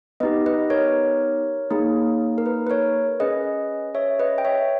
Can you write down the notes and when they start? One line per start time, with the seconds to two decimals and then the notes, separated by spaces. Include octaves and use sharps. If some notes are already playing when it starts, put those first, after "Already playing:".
0.20 B3 D#4 G4 B4 D#5
0.46 B4 D#5
0.70 A#4 C#5
1.70 A#3 D#4 G#4
2.38 A#4
2.46 B4
2.67 B4
2.70 A#4 C#5
3.20 C#4 G#4 B4 D#5
3.95 C#5 E5
4.20 B4 D#5
4.38 G5
4.45 C#5 E5